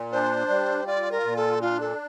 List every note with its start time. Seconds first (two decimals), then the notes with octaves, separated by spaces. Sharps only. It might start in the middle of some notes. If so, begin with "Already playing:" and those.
Already playing: A#2
0.12 D4 C5
0.49 G3
0.86 F4 D5
1.12 A#4
1.24 A#2
1.37 A4
1.61 D4 F4
1.80 A4